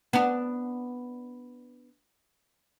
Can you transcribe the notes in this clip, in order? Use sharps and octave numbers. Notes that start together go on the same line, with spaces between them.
B3 D4